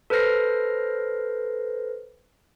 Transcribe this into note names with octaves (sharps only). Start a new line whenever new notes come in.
A4 B4 C5 F6 A#6 C7